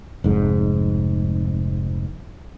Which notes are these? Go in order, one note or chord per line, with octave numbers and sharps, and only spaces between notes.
F1 G#2